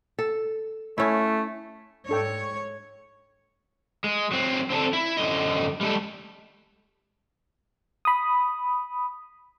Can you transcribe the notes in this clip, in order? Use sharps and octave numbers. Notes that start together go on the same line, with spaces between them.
A4
A3 C#4 E4
G#2 D4 A4 C#5 G5
G#3
F#3 C4
C4 D4 G#4 A4
E4
F#2 D3 D#5
G3 G#3 A4
B5 D#6